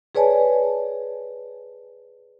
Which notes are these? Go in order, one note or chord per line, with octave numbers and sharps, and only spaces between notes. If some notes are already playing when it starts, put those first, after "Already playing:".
G#4 B4 C#5 D5 G#5 A5